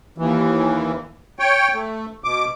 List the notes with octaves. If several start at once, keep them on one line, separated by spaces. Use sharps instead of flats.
D#2 E3
C#5 G5
A3
B2 D6